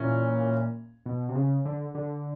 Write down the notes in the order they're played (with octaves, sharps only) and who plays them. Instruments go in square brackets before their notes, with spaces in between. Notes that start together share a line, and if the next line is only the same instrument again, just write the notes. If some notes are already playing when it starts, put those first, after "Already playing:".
Already playing: [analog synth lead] A#2 [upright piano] E3 C#4
[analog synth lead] B2
C3
C#3
D3
D3